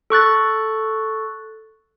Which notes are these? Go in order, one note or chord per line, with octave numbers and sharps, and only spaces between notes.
A4 C#6 F#6 A6